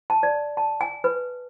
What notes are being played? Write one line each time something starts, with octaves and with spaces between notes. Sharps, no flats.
A5
D5
A5
G#5
B4